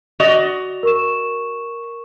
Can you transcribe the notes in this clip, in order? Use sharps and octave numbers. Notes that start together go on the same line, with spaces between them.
F#4 D5 D#5 F7
A#4 C#6 E7